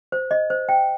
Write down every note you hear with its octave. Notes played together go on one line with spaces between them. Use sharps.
C5
D#5
C5
G5